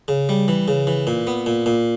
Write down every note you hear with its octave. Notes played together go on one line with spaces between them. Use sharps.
C#3
G3
E3
C#3
E3
A#2
B3
A#2
A#2